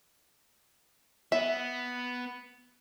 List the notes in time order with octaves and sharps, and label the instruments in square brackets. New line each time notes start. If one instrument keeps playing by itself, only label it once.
[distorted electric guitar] B3 [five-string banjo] E5